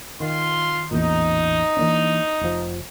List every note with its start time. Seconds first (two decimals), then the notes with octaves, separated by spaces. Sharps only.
0.20 D#3 F4 C6
0.91 A1 E2 A#2 D#4
1.77 E3 A#3 D4
2.41 F1 F3